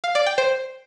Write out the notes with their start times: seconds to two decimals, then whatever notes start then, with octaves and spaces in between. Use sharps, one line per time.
0.04 F5
0.15 D5
0.26 G5
0.38 C5